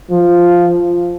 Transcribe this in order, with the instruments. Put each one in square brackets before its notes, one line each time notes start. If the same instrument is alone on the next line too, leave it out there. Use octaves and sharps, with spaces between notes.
[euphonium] F3